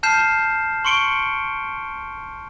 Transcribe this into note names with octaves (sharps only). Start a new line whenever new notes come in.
A5 F6 G6 C7 E7
C6 C#6 C#7 D7 G7